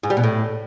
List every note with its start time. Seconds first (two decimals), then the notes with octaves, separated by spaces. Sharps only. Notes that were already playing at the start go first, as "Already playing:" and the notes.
0.03 G#2
0.10 G3
0.17 B2
0.23 A2